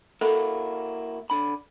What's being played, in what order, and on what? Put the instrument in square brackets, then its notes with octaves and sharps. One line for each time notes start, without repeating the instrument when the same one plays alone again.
[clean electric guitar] A#3 E4 F#4 [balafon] A4
[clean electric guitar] D3 D4 B5